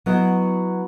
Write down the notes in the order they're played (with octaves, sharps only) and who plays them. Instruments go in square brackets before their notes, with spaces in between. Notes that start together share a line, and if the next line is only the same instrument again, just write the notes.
[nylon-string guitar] F#3 B3 E4 F#4 D#5